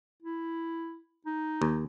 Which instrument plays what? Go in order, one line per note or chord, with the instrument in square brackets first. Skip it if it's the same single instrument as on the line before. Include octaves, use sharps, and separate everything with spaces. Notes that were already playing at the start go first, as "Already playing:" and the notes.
[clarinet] E4
D#4
[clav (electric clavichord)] D#2